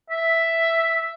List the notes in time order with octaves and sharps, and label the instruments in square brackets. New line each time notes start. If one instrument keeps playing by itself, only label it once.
[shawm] E5